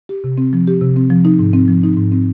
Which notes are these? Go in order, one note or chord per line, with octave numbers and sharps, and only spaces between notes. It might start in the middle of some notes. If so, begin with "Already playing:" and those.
G4
C3
C4
F3
G4
C3
C4
F3
D#4
G#2
C4
F3
D#4
G#2
C4